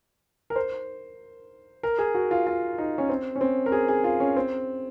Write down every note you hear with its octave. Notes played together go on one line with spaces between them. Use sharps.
A#4
C5
A#4
G#4
F#4
F4
F4
D#4
C#4
C4
C#4
C4
A#4
G#4
G#4
F4
C#4
C4